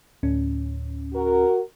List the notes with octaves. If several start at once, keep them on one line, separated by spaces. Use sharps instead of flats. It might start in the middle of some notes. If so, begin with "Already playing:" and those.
D2 A2 C#4
F#4 A#4